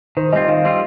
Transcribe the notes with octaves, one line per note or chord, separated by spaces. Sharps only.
D#3 C5
G3 C4 F4 D#5
D#3 F5
G3 C4 F4